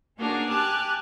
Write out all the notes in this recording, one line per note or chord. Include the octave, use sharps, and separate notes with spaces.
A#3 C#4 D4 F#4 G#4 A#4
G4 G#5 A5 D6 F6 F#6